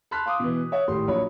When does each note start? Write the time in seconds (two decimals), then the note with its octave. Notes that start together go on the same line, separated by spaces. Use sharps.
0.11 A5 B5 C6 F6 F#6 B6
0.26 F5 C6 D6 D#6
0.40 B2 E3
0.72 C#5 E5 F#5
0.88 G#1 A2 G4 C6
1.07 A#1 F#3 C#5 B5